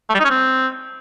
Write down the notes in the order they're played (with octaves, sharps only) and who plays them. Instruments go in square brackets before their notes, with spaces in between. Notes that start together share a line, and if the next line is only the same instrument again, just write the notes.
[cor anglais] A3
G3
D#4
C#4
C4